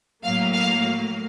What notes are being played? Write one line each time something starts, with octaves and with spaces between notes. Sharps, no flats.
A2 F#3 A#3 F5
F5